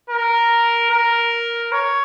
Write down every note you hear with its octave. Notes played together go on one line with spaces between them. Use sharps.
A#4
A#4
C#5